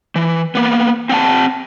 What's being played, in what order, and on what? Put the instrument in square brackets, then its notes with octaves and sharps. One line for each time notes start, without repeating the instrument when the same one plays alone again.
[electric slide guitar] E3
A#3 B3
C4 F#5 A5